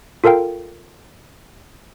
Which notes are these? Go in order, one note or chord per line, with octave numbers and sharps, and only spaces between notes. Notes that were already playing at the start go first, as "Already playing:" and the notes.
F4 A4 A#4 F5 G5